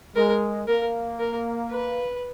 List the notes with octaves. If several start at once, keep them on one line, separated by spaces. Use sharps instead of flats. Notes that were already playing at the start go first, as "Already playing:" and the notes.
G#3 A#4
A#3 A#4
A#4
B4